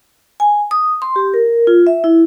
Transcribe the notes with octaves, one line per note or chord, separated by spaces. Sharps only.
G#5
D#6
C6
G4
A#4
F4
E5
E4